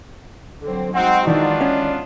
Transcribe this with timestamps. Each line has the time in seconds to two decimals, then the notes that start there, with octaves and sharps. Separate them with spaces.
0.63 D3 F#3 C4
0.94 G#3 C4 D#4 F#4 F#5
1.27 D#3 E3 B3 D4 F4 D5
1.61 C#4